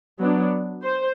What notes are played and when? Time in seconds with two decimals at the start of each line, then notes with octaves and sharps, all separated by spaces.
0.19 F#3 B3 D4
0.83 C5